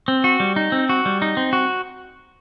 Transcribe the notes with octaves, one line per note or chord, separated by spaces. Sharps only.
C4
F#4
G3
D#4
C4
F#4
G3
D#4
C4
F#4